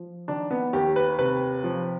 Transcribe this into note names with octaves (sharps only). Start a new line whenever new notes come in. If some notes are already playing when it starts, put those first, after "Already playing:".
Already playing: F3
D#3 D4
B3
D#2 G4
B4
C3 B4
F3